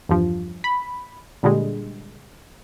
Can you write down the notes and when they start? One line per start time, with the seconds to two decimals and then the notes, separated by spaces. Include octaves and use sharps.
0.09 E2 G2 F3
0.64 B5
1.43 A#2 D3 G3 G#3